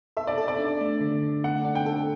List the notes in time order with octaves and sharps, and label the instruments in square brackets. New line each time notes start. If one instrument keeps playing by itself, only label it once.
[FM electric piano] A4 [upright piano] E5
[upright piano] D5
[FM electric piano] A4
[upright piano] D5
[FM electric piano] D4
A3
D3
D3
[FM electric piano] A3 [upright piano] F#5
[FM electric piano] D4
[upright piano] G5
[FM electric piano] A4